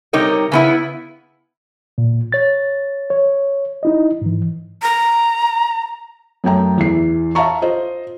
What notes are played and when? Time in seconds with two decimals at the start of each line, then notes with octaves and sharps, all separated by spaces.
0.13 C3 G3 D#4 A#4 C#5
0.52 C#3 B3 E4
1.98 A#2
2.32 C#5 A6
3.10 C#5
3.83 D#4 E4 D#5
4.22 G#2 E3
4.82 A#5
6.44 F#2 F#3 A3 G5 A#5
6.78 E2 E3 C7
7.35 E5 F5 A5 A#5 C#6
7.62 F4 C5 D#5